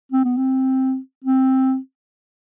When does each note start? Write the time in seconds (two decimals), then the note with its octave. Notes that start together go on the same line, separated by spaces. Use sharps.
0.12 C4
0.24 B3
0.37 C4
1.24 C4